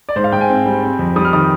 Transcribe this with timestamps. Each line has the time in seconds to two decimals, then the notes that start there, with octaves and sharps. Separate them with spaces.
0.09 D5
0.16 G#2 C5
0.24 F5
0.32 G#2 G5
0.41 G#5
0.49 C4
0.66 G3
0.83 C4
0.99 F2
1.16 G3 D#6
1.25 F6
1.33 D#3 D#6